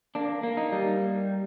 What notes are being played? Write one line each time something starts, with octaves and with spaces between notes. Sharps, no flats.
A#3 D4
A#3
D#4
G3